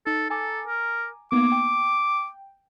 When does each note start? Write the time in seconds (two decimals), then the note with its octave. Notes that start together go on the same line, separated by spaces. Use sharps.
0.07 D#4 A4
0.30 A4 G#5 A#5 D6
0.68 A#4
1.32 A#3 B3 D#4 D6
1.52 G5